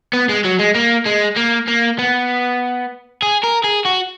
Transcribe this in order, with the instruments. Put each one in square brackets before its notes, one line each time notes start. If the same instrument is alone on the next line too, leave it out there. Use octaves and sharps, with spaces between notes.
[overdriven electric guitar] B3
G#3
F#3
G#3
A#3
G#3
A#3
A#3
B3
G#4
A#4
G#4
F#4